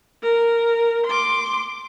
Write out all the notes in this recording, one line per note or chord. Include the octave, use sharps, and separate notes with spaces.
A#4
C6 D6